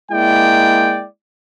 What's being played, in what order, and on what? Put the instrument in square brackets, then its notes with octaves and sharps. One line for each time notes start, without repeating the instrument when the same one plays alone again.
[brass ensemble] G#3 A#3 E4 D5 G5